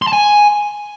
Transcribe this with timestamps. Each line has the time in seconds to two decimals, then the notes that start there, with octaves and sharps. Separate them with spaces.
0.02 C6
0.07 A5
0.13 G#5